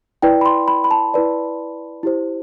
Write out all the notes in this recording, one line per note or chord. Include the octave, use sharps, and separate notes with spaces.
E4 B4 D5 G5
B5
C6
B5
B5
A5
E4 B4 D5
E4 G4 C5